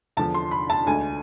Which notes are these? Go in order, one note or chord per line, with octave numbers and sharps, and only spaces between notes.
E2 D3 F3 A5
C6
B5
A5
D2 D3 G#3 G#5